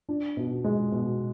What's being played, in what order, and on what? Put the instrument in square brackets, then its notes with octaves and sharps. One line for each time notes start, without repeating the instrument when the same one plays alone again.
[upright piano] D4
B2
G#3
B2